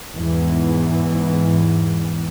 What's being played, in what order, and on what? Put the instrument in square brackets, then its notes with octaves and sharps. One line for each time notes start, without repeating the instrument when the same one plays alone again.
[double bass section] E2 G#2 E3